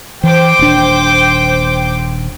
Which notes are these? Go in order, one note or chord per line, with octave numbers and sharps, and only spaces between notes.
E3 C5 G5 D6
D#1 D4